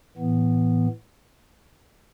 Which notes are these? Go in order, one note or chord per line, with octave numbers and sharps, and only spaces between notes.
A2 E3 B3